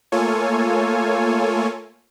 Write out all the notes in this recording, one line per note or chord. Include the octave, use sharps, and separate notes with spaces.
A3 A#3 F4 A4 C#5 G#5